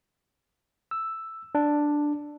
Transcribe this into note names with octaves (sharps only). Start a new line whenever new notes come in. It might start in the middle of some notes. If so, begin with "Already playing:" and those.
E6
D4